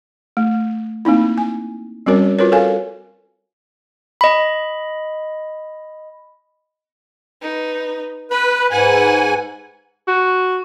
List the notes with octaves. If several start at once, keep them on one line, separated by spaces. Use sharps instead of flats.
A3
A#3 C4 D#4 E4
G#5
G3 C4 C#4 F#4 A#4 C#5
F4 F#4 A#4 B4 C#5
A4 A#4 C#5 F5 G#5
D#5 B5
D#4 B4
B4 B5
G#2 B4 F#5 G#5
F#4